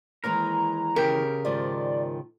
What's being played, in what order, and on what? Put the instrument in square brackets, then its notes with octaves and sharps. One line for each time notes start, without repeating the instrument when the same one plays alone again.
[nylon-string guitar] D#2 E3 G#3 [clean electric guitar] A#4 [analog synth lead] A#5
[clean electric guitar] C#3 G4 G5 [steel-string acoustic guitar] A#4
[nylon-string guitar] G#2 D#3 F3 [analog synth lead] D5